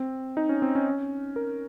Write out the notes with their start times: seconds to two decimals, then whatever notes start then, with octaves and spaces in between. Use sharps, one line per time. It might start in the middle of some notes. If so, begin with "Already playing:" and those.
Already playing: C4
0.37 D#4
0.49 C#4
0.62 C4
0.75 C#4
1.36 A#4